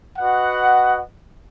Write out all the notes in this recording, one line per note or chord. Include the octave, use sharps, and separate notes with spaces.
F#4 B4 D#5 F#5